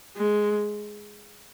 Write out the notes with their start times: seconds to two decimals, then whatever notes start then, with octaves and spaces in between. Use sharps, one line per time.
0.16 G#3